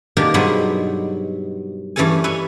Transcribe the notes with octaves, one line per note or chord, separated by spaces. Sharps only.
B2 D#3 A#3 D4 G4 A#4
G2 B2 F#3 G#4 C5 B5
G2 E3 A3 C#4 A4 G#5
B4 C#5 E5 G#5